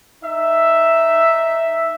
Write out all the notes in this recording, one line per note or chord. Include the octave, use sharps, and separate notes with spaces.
D#4 E5